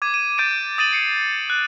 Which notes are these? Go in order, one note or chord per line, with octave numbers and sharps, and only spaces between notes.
D6 G#6 D#7
D#7
D6 G6 A6 D7 D#7
D#6 A6 D#7 F#7
C7 C#7
F#6